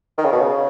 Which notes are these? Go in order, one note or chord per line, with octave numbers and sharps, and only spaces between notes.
D#3
C#3
B2
C#3